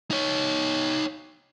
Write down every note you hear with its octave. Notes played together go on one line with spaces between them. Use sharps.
D#4 C#5